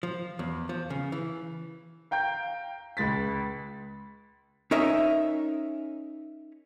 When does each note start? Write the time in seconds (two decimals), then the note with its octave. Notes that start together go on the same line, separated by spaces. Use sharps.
0.03 F3
0.39 E2
0.69 F3
0.90 C#3
1.12 E3
2.11 F5 G5 A#5 G6
2.97 C#2 G#3 A6 B6
4.71 C#4 D#4 A#4 D#5 E5